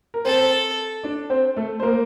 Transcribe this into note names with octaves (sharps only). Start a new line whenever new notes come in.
A#4
C4 A4 C5
D4 D5
C4 C5
A3 A4
C5
A#3 A#4